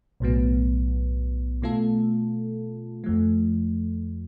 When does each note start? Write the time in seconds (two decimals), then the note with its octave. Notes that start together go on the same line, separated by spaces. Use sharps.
0.20 B1 A2 F#3 B3
1.62 B2 A3 F4 A4
3.04 F2 F3 A3